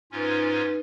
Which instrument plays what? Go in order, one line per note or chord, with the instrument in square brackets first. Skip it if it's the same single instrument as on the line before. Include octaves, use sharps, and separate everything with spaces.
[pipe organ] G#2 C#4 F4 [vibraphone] D#4 B4